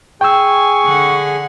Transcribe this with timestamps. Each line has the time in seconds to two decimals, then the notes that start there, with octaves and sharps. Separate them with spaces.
0.21 G#4 G5 G#5 C#6 E6
0.87 D3 F#5